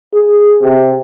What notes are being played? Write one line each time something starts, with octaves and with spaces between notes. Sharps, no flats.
G#4
C3